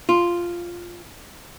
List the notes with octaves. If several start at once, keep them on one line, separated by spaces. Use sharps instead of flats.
F4